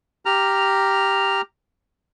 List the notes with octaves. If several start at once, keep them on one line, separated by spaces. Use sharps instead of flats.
G4 A#5 F6